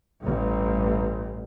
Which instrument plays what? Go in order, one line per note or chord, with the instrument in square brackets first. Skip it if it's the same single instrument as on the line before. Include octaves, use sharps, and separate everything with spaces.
[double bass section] A1 G2